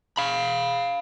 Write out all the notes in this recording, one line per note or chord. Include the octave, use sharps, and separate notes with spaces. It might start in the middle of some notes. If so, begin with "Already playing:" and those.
F5 B5